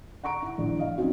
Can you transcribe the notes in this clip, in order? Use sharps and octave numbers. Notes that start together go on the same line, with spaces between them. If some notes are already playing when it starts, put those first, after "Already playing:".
F#5 A#5 C#6 D7
E4
A#1
D#5 F5
F#3 C4 C#4 D#4 F#4